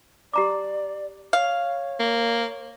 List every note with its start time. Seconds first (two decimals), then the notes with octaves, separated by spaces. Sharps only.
0.34 G4 D5 A#5 D6
1.33 C#5 F5
2.00 A#3